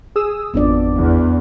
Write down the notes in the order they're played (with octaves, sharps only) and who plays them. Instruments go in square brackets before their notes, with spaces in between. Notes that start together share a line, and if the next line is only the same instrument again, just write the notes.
[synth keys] G#4 D#6 E6
[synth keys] G#1 F2 [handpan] B3 D4 D5
[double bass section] E2